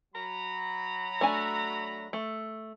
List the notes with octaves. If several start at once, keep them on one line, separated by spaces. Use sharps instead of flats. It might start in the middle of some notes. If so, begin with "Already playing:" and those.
F#3 A#5 B5
A3 D4 G#5
A3